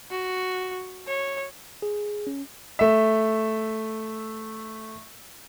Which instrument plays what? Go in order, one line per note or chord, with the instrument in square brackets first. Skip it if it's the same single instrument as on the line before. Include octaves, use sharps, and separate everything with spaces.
[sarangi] F#4
C#5
[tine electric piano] G#4
C#4
[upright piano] A3 E5